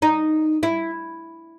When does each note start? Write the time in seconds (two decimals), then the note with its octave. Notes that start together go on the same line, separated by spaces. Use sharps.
0.02 D#4
0.63 E4